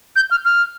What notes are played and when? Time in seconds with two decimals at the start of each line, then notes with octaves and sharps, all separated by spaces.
0.16 G6
0.31 F6
0.45 F6